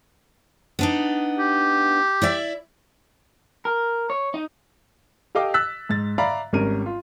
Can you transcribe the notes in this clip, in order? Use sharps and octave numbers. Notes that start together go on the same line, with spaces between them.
B3 D4 D#4
G4
E4 D5 E5
A#4
C#5
D#4
G4 A4 D#5 F5 G5 D6
E6 F#6 A6 B6
G#2 A6
D5 E5 F5 A#5 B5
G#1 G3 C#4 A#4 D#7
F4